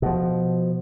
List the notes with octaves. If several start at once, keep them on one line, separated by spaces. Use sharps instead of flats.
B2 F3